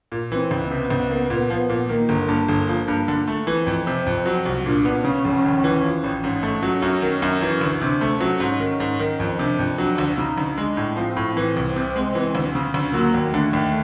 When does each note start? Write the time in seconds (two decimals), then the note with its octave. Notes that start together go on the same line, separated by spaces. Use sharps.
0.12 A#2
0.32 E3 C4
0.51 C#2
0.71 C3 B3
0.90 C#2
1.11 A#3
1.30 A#2
1.50 F3
1.69 A#2
1.89 D#3 A#3
2.09 G1
2.28 G2 A#3
2.49 G1
2.68 F3
2.88 G2
3.08 D3
3.28 A3
3.47 E3 C4
3.67 F2
3.87 C3
4.06 F2
4.26 F#3
4.46 C2
4.65 A#2 D4
4.85 B3
5.04 C#3 C#4
5.24 F1
5.45 D#2
5.64 E3
5.84 F3
6.04 A1
6.23 G#2 C#4
6.43 A3
6.63 F#3 C#4
6.82 F#2
7.02 D#3
7.22 F#2
7.42 E3
7.61 D2
7.81 C3 D4
8.01 A3
8.20 F#3 C#4
8.40 G#2
8.60 D#3
8.80 G#2
8.99 D#3
9.20 F2
9.39 C3 D4
9.59 F2
9.78 F#3 D4
9.98 D2
10.18 C#3 D#4
10.38 D2
10.57 G#3 D4
10.77 A2
10.97 F3 C4
11.17 A2
11.36 E3 C4
11.56 C2
11.76 C3
11.96 G#3
12.15 E3
12.35 D2
12.55 C#3
12.74 D2
12.94 F#3 A#3
13.14 D#2
13.34 D3 A3
13.53 D#2